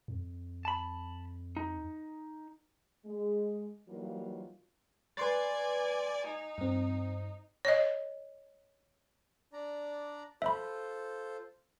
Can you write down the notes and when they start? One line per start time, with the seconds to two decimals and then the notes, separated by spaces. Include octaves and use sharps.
0.08 F2
0.65 A5 B5
1.57 D#4
3.06 G#3
3.89 E3 F#3 G3 A#3 D#4 F4
5.17 B4 D5 G#5 C6 A6
6.27 D#4
6.58 G2 C4
7.65 C#5 D#5
9.53 D4 D5 A#5
10.42 F4 A4 C5 E5 B5